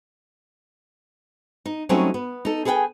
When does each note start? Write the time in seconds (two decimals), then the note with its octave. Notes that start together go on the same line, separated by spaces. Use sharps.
1.66 D#4
1.89 F#3 G3 A3 C4 C#4 D#4
2.14 B3
2.45 D#4 A4
2.65 G#4 A4 B4 F5 G5 G#5